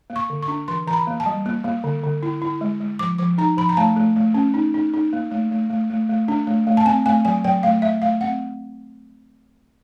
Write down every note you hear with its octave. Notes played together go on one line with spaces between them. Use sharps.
A#3
C#6
D3
C#6
D4
E3 C6
E3 A#5
B5
A#3
A5
G3
A#3
A#3
D3
D3
E4
E4
G#3
G#3
F3 D6
F3 D6
D#4 A#5
F3 B5
A#5
A3 A5
A3
A3
C#4
D#4
D#4
D#4
A#3
A3
A3
A3
A3
A3
D4
A3
A3
A5
C4 G#5
A3 G#5
F#3 G#5
F#3 G5
A3 F5
A3 E5
A3 F5
C4 F#5